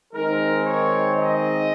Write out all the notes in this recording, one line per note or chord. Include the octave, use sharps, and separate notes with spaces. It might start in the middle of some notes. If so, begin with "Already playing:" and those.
D#3 G#3 C4 D#4 A#4
C#5
D#5